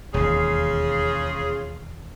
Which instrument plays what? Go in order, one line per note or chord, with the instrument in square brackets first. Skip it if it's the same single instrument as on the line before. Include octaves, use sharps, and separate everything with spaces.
[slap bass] E1 D#2 [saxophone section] C#3 F4 G#4